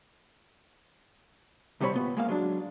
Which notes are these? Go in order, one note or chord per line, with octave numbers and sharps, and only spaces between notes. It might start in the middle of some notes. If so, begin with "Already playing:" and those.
C2 C3 G3 C4 C#5 B5
A#2 B3
G#3 A#3 F5
F#3 G#3 D4